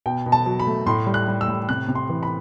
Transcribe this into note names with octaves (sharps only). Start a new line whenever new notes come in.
B2 G5
B2
A5
F#3
B5
A3
A2 C6
G3
F#6
G3
E6
A2
C3 F#6
C3
C6
E3
B5